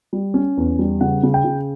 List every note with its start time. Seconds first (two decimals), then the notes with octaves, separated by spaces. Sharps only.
0.13 G3
0.34 C#4
0.57 E2
0.79 G3
1.01 C#3 F#5
1.23 C#3
1.34 G5
1.44 C#3